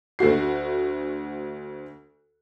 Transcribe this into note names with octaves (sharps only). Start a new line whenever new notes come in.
D2 A3 F#4 C7